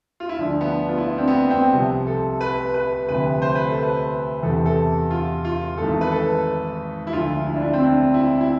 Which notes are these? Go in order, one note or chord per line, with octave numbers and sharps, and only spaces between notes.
F4
E4
D2 D3 F3 D4
B3
F4
E4
D4
C4
B3
C4
C2 C3 F3
A4
B4
B4
D2 C3 F3 B4
C5
B4
A4
B4
E2 C3 E3 A4
A4
F4
F4
G#1 G#2 E3 A4
B4
A4
E4
D2 D3 F3 F4
E4
D4
E4
C4
D4
E4
E4